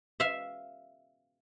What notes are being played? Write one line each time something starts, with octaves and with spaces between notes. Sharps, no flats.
E5 F5